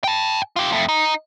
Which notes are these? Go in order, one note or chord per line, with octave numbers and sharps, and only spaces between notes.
G5 A5
F4 G4
F2 A3
D#4